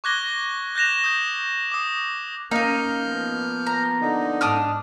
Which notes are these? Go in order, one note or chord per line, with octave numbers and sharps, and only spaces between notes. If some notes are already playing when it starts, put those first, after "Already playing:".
C#6 D6 F#6 G#6 A#6 G7
F#6 G6 A#6 E7 F7
D#6 G6
D6 D#6
A#3 C#4 D#4 F5 F6 G6
F3 B3
A#5
D3 D#4
G#2 D4 D#6 F6